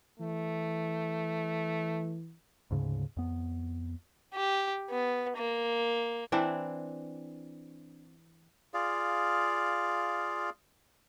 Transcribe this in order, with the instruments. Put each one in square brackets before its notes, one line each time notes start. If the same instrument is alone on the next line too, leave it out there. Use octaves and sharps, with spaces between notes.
[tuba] E3 [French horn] A3
[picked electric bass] D2 G#2 C#3
F2 B3
[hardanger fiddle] G4
B3
A#3
[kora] E3 C4 D4 E4
[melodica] F4 G#4 D5 F5